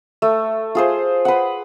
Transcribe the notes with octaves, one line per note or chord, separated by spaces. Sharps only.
A3
F4 G#4 C5
B4 F#5